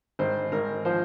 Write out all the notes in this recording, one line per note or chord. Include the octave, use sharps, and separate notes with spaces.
G#1 C5
G#1 A#4
F3 C5